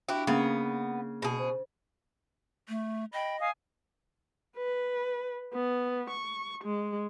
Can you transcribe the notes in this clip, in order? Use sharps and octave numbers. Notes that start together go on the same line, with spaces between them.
D4 E4 F#4 G4 G5
C#3 A#3 B3 F5
B2 G#4
C5
A3
D#5 G5 B5
F5 G#5 D#6
B4
B3
C#6
G#3